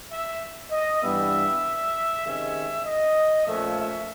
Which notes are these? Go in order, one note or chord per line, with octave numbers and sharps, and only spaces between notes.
E5
D#5
G2 E3 G3 B3 E5
C3 D#3 G#3 C#4 E5
D#5
A#2 F3 A3 C#4 E5
E5